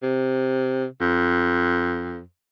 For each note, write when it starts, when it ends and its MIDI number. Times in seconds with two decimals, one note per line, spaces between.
0.03 0.85 48
1.01 2.21 41